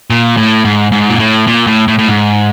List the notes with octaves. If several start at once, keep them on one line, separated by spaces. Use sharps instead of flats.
A#2
A2
G#2
G#2
A#2
A2
A#2
A2
A2
A2
G#2